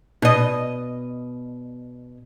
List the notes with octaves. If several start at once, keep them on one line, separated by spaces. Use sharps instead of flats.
B2 D#5